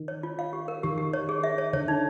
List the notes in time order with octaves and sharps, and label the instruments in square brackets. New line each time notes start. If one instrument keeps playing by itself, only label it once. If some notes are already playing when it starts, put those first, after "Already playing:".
Already playing: [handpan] D#3
[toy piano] C#5
F4
F5
G4
A#4
[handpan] D#3 [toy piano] G4
[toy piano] G4
C#5
G#4
E5
C#5
[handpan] D3 [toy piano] C#5
[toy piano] D#4